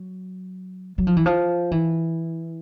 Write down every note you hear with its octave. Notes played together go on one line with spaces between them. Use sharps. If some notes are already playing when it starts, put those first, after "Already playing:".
Already playing: F#3
F#3
F3
E3
F3
E3